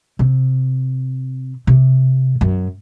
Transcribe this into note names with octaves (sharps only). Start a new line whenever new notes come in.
C3
C3
F#2